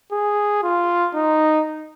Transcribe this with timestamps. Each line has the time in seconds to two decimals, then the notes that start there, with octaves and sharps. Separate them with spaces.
0.12 G#4
0.63 F4
1.15 D#4